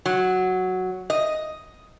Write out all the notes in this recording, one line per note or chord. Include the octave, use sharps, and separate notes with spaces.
F#3
D#5